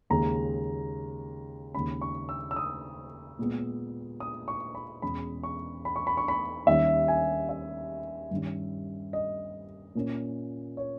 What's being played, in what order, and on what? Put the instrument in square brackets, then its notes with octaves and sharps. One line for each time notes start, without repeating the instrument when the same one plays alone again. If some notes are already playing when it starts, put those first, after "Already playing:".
[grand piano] D#2 C#3 G#3 A#5
D#2 C#3 G#3 C#4 B5
C#6
E6
E6
D#6
A#2 G#3 B3
D#6
C#6
B5
E2 B2 G#3 C#4 B5
C#6
B5
C#6
B5
C#6
B5
D#2 D#3 G3 C#4 E5
G#5
E5
G2 D#3 G3 C#4
D#5
A#2 A#3 C#4
C#5